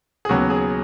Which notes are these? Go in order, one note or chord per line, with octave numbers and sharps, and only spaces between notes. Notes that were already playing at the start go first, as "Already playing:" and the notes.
G#4
D#2 C#3 F#3 B3 F#4
G#4